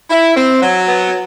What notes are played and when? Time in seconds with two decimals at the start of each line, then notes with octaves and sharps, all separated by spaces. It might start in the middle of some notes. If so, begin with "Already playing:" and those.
0.10 E4
0.36 C4
0.62 F#3
0.87 B3